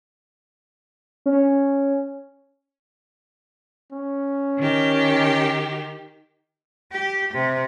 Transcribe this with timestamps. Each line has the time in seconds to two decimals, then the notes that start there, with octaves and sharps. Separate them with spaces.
1.26 C#4
3.93 C#4
4.58 D#3 G4
6.91 G4
7.34 C3